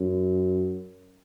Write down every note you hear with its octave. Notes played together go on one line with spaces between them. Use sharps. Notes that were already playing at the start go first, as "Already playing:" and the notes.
Already playing: F#2